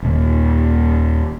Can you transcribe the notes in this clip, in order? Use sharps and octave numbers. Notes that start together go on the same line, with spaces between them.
D#1 D#2